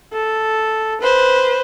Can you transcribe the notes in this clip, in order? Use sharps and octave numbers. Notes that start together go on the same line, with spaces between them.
A4
B4 C5